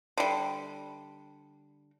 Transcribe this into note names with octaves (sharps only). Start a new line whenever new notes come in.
D3 G3